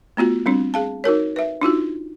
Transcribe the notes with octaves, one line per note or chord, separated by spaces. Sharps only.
A3 B3 F4 F#4
G3 C4 D4
G#4 F5 A5
D#4 F#4 A#4 C#5
B4 E5
D4 D#4 F4 F#4